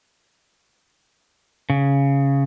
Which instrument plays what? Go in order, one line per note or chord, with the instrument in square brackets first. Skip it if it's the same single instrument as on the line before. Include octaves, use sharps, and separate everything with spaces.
[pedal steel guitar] C#3